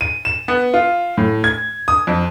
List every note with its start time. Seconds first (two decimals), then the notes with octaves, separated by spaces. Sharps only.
0.01 D#7
0.25 E7
0.48 B3
0.74 F4
1.18 A2
1.44 G#6
1.88 D#6
2.07 F2